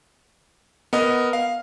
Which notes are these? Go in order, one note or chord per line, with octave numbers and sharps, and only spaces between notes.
B3 A#4 D#5
F5